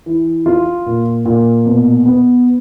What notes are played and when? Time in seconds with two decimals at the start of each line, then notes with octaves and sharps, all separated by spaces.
0.06 E3
0.46 F4
0.86 A#2
1.25 A#2
1.66 B2
2.06 B3